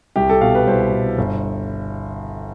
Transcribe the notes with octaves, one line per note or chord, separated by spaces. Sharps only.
C2 G4
A4
B2 F5
B4
C2 C5
B2
G1